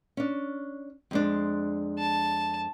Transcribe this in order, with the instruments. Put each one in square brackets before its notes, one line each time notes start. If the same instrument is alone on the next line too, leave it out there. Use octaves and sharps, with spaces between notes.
[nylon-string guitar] C#4 D4
F2 G#3 D4
[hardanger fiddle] A5